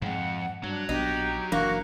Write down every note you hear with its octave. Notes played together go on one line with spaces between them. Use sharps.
F2 G#2 G#3 F#5
G2 F#3 D4
A#1 B3 D4 D#4 G4
F#1 E3 A#3 D4 F#4